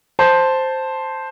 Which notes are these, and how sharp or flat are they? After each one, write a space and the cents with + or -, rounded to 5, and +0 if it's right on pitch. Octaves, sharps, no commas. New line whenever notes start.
C5 +0 A5 +0